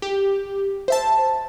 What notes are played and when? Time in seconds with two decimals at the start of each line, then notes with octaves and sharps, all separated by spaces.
0.02 G4
0.88 C5 E5 A5